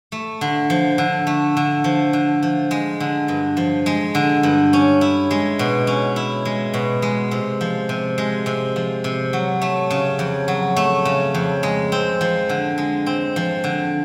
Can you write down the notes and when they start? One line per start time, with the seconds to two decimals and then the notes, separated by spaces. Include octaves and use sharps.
0.12 A3
0.41 D3
0.70 F3
0.98 D3
1.27 A3
1.57 D3
1.84 F3
2.13 D3
2.43 F3
2.71 G#3
3.00 D3
3.28 G2
3.57 F3
3.86 G#3
4.15 D3
4.43 G2
4.73 C#4
5.01 E4
5.31 G#3
5.59 B2
5.87 C#4
6.16 E4
6.45 G#3
6.74 B2
7.02 G#3
7.31 C3
7.61 F3
7.89 C3
8.18 G#3
8.46 C3
8.76 F3
9.04 C3
9.33 F#3
9.62 A3
9.90 C#3
10.19 F2
10.48 F#3
10.76 A3
11.05 C#3
11.34 F2
11.63 G#3
11.92 C4
12.21 F3
12.49 D3
12.78 G#3
13.06 C4
13.36 F3
13.64 D3